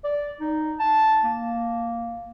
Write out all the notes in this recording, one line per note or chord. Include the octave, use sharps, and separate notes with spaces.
D5
D#4
A5
A#3